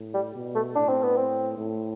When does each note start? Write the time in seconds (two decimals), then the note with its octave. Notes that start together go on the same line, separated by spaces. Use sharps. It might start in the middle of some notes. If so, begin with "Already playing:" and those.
Already playing: A2
0.14 G3
0.35 B2
0.55 A3
0.76 A2 D4
0.89 C4
1.03 B3
1.16 C4
1.57 A2